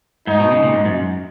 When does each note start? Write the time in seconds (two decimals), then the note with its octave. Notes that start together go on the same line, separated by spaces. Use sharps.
0.27 G#2 D#4
0.39 B2
0.51 C#3
0.63 A#2
0.74 G#2
0.85 F#2